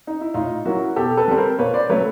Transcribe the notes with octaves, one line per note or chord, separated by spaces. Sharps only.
D#4
E4
A2 D#4 F4
F#3 A#3 C#4 E4 F#4
B2 G4 A4
A4 B4
G3 C4
A#4 C5
A#2 B4 C#5
C5 D5
F#3 A3 C#4 B4 C#5